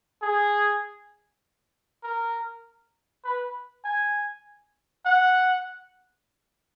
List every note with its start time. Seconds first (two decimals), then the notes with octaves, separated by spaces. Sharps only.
0.22 G#4
2.03 A#4
3.24 B4
3.84 G#5
5.06 F#5